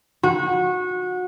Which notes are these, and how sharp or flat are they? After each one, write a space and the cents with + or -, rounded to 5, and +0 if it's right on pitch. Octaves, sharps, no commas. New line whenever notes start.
F#4 -25